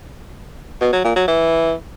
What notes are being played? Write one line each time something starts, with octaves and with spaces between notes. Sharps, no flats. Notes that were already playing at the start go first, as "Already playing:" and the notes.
B2
F#3
A#2
F#3
E3